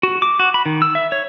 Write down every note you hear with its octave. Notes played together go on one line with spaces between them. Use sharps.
F#4
D6
F#4
B5
D#3
E6
E5
C#5